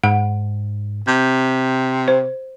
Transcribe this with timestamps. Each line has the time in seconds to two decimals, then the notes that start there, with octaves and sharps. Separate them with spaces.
0.04 G#2 F#5
1.07 C3 G6
2.08 C5